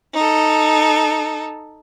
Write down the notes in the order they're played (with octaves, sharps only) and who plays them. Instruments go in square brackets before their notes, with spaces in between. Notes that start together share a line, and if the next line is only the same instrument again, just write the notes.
[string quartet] D#4 A4